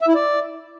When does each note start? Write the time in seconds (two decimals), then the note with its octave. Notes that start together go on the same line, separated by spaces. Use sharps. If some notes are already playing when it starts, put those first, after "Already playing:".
0.01 E5
0.08 E4
0.15 D5